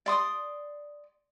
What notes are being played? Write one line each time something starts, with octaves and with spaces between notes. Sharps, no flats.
D5 C6 D#6